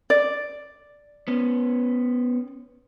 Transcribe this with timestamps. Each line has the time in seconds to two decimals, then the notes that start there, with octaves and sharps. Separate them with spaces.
0.10 D5
1.28 B3 C#4